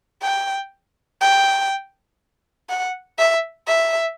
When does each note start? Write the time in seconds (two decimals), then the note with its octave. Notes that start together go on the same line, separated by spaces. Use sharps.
0.22 G5
1.21 G5
2.69 F#5
3.19 E5
3.67 E5